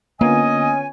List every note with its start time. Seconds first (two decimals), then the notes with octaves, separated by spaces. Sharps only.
0.21 D3 A#3 B3 C#4 F4 D#5 G#5